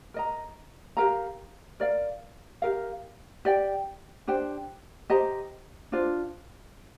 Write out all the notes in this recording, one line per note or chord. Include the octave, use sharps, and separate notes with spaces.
A#4 D#5 A#5
G4 A#4 F5 A#5
A#4 D5 F5
G4 A#4 F5
G4 D5 G5
D4 G4 C5 G5
G4 C5 D#5 A#5
D4 F4 C5